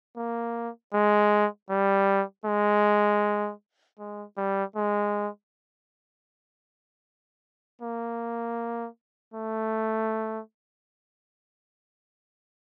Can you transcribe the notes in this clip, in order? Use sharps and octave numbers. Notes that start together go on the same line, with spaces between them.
A#3
G#3
G3
G#3
G#3
G3
G#3
A#3
A3